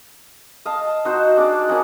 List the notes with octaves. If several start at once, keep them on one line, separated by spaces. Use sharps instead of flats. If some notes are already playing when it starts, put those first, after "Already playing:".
D#5 F5 A5
D#4 F#4 C5
D4 G#4 D5
A#3 C#4 D#4 F#5